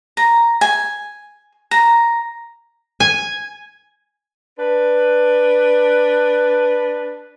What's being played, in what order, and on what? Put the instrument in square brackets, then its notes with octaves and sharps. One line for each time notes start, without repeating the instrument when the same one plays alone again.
[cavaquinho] A#5
G#5
A#5
[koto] G#5
[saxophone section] D4 B4